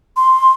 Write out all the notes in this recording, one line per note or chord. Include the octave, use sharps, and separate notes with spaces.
C6